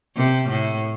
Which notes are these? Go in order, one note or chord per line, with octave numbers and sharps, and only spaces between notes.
C3
A2